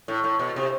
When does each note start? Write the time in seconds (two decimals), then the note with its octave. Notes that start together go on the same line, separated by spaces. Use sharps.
0.08 A2
0.24 A2
0.39 B2
0.56 C3